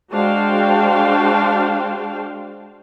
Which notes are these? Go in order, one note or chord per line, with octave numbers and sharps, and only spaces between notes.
G#3 D4 F#4 C5 F5 G5